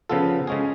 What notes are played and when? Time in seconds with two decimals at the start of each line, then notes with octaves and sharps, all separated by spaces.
0.09 C#3 F3 B3 F4 A4
0.47 C#3 G#3 C#4 G#4